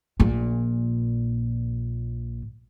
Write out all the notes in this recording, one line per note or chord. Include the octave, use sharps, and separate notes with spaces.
A#1 A#2